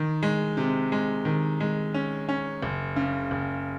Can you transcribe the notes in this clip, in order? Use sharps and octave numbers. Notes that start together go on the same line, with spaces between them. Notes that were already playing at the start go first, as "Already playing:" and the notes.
Already playing: D#3
G#3
C3
G#3
D#3
G#3
C#4
C#4
F#1
C#3
F#1